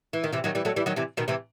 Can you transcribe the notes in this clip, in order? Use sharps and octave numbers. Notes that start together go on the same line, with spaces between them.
E3
D#3
C3 E3
D#3 F#3
E3 G3
F#3 A3
E3 G3
D#3 F#3
C3 E3
B2 D#3
C3 E3